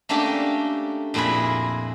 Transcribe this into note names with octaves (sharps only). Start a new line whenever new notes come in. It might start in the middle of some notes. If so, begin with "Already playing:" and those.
A3 A#3 C#4 D4 G4 A4
F2 A#2 A#3 E4 G#4 B5